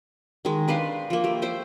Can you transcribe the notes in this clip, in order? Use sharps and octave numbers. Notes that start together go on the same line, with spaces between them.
D#3 G#3
D4 B4 C5 F5
F3 A#3
A3 G4
E4 C5 G5